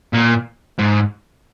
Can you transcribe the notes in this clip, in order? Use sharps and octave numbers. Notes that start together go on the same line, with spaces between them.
A#2
G#2